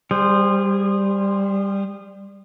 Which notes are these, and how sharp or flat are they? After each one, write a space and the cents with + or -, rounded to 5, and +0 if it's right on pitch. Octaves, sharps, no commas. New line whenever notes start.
G3 +10 G#4 -30 C5 +0